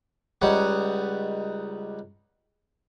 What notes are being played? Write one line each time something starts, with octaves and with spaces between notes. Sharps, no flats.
C#2 G3 D#4 C#5 F#5